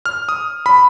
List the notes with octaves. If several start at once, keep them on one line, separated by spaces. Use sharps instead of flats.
F6
D#6
B5